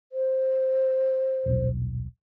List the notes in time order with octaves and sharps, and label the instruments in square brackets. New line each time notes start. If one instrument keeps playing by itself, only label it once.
[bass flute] C5
[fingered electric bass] D#1 B1